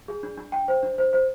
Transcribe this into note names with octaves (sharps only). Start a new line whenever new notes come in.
G#4
D4
D4
G5
C5
D4
C5
C5